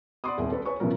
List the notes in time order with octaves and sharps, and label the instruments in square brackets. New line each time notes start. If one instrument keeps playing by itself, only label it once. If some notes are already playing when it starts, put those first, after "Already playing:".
[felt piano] D5 F#5 B5 C6 D6 D#6
D#1 C2 G#4
A4 B4
B4 C#5 G#5 C#6
A1 B2 F3 F#3 A#4